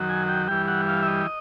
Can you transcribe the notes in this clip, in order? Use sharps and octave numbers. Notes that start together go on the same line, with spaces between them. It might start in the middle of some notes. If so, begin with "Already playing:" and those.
Already playing: F#2 D#3 F#3
G#5
G5
G2 E3 G3 G5
F#5
F5
E5
D#5